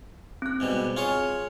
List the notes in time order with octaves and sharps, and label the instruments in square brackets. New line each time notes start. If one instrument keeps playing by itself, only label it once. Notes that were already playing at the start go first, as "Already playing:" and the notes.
[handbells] C4 F#6
[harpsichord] G#2 B2 G3
F4 G#4 C#5